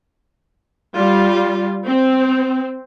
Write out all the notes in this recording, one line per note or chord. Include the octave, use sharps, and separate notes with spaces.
G3 F4
C4